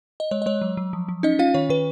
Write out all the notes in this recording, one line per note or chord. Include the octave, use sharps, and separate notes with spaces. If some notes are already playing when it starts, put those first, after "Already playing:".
D#5
G#3 C#5
D#5
G#3 C#5
F#3
F#3
F3
F3
C#4 D#4 D#5
C#4 F4 F5
D#3 C#5
D#3 B4